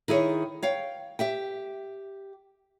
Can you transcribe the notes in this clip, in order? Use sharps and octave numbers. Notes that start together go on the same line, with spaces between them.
D#3 E4 G#4 C#5
C#5 F5 G5
G4 E5 G5